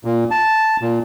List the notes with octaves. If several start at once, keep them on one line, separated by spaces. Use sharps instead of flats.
A#2
A5
A#2